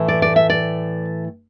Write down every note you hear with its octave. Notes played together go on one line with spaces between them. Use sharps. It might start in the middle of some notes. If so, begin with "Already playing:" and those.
Already playing: A2 E3 A3
D5
D5
E5
D5